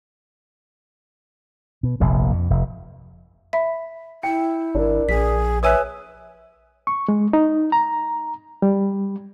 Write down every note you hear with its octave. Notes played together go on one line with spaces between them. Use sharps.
B2
F1 A#1 C3
F2
F1
E5 B5
E4 G5 C#7
G#1 D4 A#4
A#1 G#4 B6
B4 C#5 E5 G#5 D#6 E6 F#6
C#6
G#3
D#4
A#5
G3